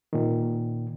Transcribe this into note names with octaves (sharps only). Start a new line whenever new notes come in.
A#2 D#3